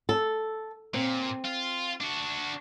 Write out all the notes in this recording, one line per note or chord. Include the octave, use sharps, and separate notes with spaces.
A4
A#2 C4
F4
D4 F#4